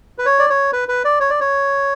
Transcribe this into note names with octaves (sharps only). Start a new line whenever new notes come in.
B4
C#5
D5
C#5
B4
B4
D5
C#5
D5
C#5